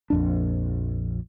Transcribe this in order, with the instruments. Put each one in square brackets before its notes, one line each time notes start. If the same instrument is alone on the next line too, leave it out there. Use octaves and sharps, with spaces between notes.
[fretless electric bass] A#1 F2 D4